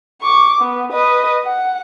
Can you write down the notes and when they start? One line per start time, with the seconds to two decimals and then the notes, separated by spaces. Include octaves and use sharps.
0.22 C#6 D6
0.62 B3
0.93 B4 D#5
1.44 F#5